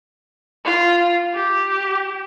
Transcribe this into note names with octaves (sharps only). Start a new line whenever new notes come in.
F4
G4